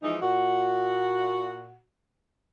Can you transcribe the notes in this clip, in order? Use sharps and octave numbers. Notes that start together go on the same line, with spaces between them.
E3 F3 G#3 D#4
A#2 F#4